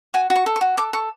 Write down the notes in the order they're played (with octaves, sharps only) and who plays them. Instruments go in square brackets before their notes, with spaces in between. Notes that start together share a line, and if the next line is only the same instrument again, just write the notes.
[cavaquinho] F#4 G#5
F#4
C#6
A4
C#6
F#4
A4 D6
A4 C#6